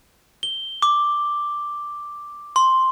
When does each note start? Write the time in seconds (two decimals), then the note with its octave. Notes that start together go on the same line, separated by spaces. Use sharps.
0.43 G7
0.82 D6
2.56 C6